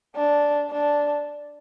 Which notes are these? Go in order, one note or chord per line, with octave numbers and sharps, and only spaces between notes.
D4
D4